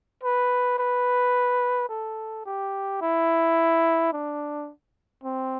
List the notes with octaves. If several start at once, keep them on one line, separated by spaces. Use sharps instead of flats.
B4
B4
A4
G4
E4
D4
C4